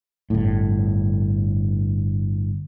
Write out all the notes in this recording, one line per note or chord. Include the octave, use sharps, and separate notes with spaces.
G1 A2